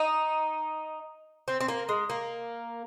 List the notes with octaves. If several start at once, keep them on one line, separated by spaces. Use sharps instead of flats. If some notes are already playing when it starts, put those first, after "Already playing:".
Already playing: D#4
C4
C4
A#3
G#3
A#3